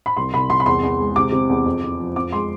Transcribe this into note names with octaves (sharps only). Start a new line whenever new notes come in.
B5
C2 C6
C2 B5
C2 C6
B5
E2 C6
E2
G#3
C3 D6
C3
E2
F2
F2
F3
F2 D6
G#3 C6